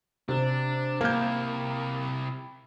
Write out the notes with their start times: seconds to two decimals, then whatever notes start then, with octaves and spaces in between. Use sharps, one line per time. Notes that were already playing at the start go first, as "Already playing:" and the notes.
0.29 C3 D4
1.01 C3 A#3 E4 G6